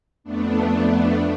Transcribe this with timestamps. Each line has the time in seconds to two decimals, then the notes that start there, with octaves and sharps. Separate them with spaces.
0.24 F2 A3 B3 D4